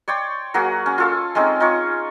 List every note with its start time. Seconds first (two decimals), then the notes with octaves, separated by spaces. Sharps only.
0.08 C#5 D5 G5 C6
0.54 F#3 A#3 F#4 G#4
0.86 C#4
0.98 F4 A4 F5
1.35 G#3 C4 C#4 D#4
1.60 D#4 F4 C#5